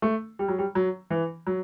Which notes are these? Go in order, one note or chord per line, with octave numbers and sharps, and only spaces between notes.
A3
G3
F#3
G3
F#3
E3
F#3